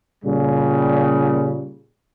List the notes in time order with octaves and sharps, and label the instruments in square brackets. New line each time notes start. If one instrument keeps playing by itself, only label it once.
[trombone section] A#2 C#3 G3